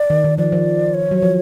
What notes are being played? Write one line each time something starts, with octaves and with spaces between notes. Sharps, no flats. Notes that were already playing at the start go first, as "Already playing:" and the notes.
Already playing: D5
D#3
D#3
F3 D5
F3
C#5
F#3
F3